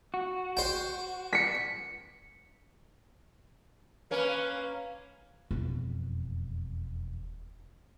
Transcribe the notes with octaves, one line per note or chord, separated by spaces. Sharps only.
F#4
C5 G5
B6 C#7
A#3 C#4 B4
E1 F2